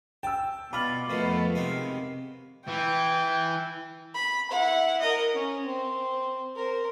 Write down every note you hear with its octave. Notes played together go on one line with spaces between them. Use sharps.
G5 A5 E6
B2 F4 D5 B5 F6 F#7
F2 B2 D#3 A3 B3 F5
C3 D#3 G#3 B3
E3 G5
B5
E4 F#5
A#4 D#5
C#4
C4
A#4 C5